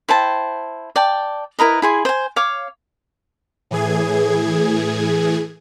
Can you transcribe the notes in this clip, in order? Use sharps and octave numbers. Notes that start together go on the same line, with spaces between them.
E4 C5 G5 A5
D5 G5 A5
E4 A#4 B4 D#5
E4 G#4 C6
C5 G#5
C#5 F5 D6
A2 E3 G#4 G#6